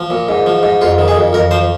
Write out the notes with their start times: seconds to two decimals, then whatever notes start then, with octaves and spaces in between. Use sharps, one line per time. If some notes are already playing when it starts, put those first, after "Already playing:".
Already playing: F3
0.10 A#2
0.29 G#2
0.46 F3
0.63 G#2
0.81 F2 F4
0.98 D#3
1.08 G#4
1.16 F2
1.33 F2 A#4
1.51 F3 C5